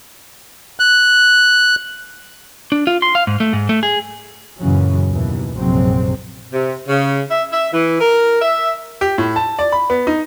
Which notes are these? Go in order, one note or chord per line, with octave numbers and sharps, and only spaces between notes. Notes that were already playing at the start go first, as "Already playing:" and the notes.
F#6
D4
F4
C6
F5
G#2
A3
G#2
A3
G#4
F#2 A#2 C#3 E3 F#3 C#4
D#2 B2 E3
A#1 F#2 C3 F#3 G#3 C4
C3
C#3
E5
E5
E3
A#4
E5
G4
A2
A5
D5
B5
B3
D#4